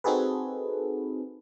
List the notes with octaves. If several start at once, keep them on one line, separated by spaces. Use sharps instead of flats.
C4 D#4 F#4 G#4 A4 B4